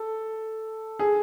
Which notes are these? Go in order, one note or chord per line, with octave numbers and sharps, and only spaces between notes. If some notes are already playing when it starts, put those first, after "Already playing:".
Already playing: A4
G#4